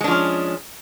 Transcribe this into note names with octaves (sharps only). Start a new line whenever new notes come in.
F3 G#3 C#4 D4